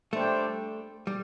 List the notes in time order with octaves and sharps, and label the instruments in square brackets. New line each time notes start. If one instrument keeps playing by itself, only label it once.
[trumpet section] G3 D4 C5 G5 [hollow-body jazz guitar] A3
[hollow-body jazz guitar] G3